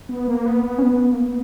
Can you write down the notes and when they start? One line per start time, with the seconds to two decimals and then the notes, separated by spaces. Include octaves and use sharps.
0.09 B3
0.28 A#3
0.46 B3
0.64 B3
0.78 C#4
0.83 B3
1.13 A#3
1.20 B3